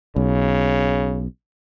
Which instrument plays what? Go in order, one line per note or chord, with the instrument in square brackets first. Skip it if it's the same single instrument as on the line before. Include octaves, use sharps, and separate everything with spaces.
[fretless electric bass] B1 [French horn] C#3